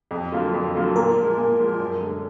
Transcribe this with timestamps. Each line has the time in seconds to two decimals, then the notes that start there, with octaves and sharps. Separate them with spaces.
0.11 F2
0.32 D3 F#3 A#3 F4
0.54 F2
0.75 D3 F#3 A#3 F4
0.95 A#2 A#4
1.17 F3 G#3
1.37 A#2
1.59 F3 G#3
1.80 F#2
2.01 D3 G#3